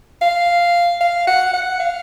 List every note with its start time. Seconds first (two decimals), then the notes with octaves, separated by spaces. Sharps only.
0.21 F5
1.01 F5
1.27 F#5
1.53 F#5
1.79 F5